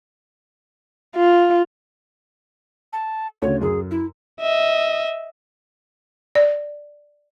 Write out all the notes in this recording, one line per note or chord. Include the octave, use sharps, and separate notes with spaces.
F4
A5
D2 C#3 C#5
F#2 G#4
E4
D#5 E5
D5